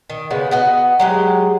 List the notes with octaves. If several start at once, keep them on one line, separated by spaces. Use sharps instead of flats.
D#3
C#3 G#3 B3
B3 F#4 D#5
F#3 G#3 G4